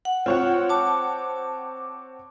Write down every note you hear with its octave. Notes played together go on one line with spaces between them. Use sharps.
F#5
C4 F4 C#5 F#5
A5 D6